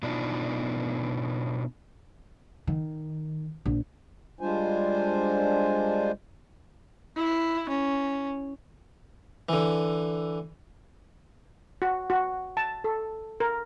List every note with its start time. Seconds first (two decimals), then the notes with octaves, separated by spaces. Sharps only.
0.03 B2 B3 D4 D#4 F4
2.67 D#3
3.66 A#1
4.41 G3 G#3 D4 F4 C5 G#5
7.16 E4
7.69 C#4
9.49 D3 E3
11.82 F#4
12.10 F#4
12.57 A5
12.84 A4
13.40 A#4